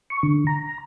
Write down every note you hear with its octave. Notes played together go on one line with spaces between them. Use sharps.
C#6
D3
A#5